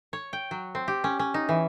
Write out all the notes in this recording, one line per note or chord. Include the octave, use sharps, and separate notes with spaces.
C#5
G5
F#3
C4
G4
C#4
C#4
D#4
E3